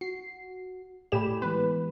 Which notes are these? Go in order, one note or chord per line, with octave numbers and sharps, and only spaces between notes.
F#4 C7
A2 G4 D5 G#5 B5 E7
E3 G#3 B3 B4